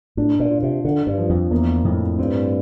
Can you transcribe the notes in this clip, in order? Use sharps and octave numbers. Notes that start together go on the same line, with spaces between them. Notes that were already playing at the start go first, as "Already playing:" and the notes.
A2 D4
A#2
F4
C3
D3 D4
G2
F3
F2
E2 A#3
F2 A2
G2 C4